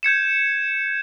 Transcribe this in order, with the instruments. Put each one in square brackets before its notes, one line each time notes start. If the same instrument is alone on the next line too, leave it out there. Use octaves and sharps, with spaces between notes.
[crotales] G6 G#6 C#7 E7